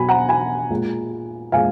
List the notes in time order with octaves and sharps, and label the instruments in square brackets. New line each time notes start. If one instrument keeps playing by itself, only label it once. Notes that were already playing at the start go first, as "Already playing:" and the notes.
Already playing: [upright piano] B2 F#3 G#5 B5
F#5 A#5
G#5 B5
A#2 G#3
A#2 G#3 F5 G#5